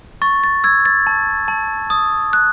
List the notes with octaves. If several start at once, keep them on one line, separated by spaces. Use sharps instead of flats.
C#6 A6
A6
E6 G#6
A6
A5
A5
D#6
F#6